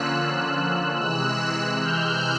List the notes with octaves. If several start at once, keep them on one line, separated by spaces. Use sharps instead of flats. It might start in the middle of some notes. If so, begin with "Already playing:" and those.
Already playing: D3 F3 A#3 C#4 F4 E6 F#6
C3 E3 G#3 E6 F#6
F6 G6